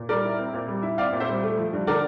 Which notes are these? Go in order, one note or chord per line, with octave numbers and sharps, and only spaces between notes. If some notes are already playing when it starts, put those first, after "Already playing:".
Already playing: A#2
G3 A#4 D5
E4
C4
A#2
G3
E4
C4 D5 F5
A#2
C5 E5
G3
A3
F3
G2
D3 A#4 D5